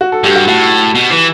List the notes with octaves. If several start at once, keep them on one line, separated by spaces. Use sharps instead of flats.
F#4
A4
G2 G4
F#4
A2 F#4
B2
E3